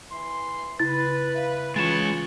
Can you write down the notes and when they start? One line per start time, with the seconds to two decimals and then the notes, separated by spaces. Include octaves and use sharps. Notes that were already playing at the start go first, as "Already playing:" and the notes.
0.10 E3 C6
0.80 C#3 E4 B4 A6
1.34 E5 F5
1.76 E3 G#3 C#4 F4 C#5 A6 E7